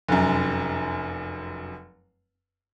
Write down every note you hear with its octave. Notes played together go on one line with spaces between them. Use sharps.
F1 F#2